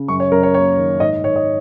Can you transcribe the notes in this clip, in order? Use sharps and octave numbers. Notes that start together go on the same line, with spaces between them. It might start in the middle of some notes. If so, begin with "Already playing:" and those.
Already playing: C#3
F#2 C#6
C#5
F#2 A#4
C#5
A#3 C#5
D#3
G#2 D#5
G#2 C#5
D#5